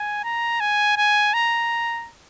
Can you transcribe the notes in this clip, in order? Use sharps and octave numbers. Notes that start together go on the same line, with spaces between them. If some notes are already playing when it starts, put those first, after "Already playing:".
Already playing: G#5
A#5
G#5
G#5
A#5